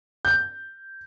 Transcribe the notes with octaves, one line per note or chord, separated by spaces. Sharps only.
G6